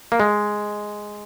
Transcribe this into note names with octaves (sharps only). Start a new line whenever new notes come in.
A#3
G#3